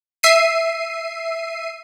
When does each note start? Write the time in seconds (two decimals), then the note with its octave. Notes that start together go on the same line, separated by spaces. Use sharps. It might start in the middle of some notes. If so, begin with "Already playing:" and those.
0.23 E5 C7 D#7